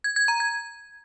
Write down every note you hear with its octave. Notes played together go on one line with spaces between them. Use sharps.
G#6
G#6
A#5
G#6